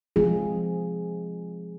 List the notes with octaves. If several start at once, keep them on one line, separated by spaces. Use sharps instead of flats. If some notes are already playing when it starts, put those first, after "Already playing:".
F3 G#3 C4 F4 G#4